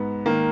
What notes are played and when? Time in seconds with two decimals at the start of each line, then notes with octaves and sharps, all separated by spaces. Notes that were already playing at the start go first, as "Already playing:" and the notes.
Already playing: G#2 B3
0.26 D#3 A#3